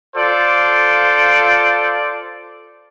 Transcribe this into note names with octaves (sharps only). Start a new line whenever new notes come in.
F4 A4 C5 D5